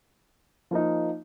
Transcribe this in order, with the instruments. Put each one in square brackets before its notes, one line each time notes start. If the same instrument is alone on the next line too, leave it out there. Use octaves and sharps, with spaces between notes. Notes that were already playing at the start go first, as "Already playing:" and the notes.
[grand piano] F3 A#3 D#4